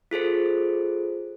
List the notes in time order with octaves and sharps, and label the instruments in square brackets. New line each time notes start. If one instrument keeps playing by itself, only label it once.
[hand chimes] F4 G#4 A4 C5